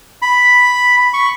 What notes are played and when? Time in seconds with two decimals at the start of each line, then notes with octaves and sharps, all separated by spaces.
0.22 B5
1.14 C#6